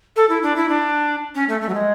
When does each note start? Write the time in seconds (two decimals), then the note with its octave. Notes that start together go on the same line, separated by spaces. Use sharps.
0.16 A4
0.29 E4
0.43 D4
0.56 E4
0.69 D4
1.35 C#4
1.49 A3
1.61 A3
1.69 F#3
1.74 G#3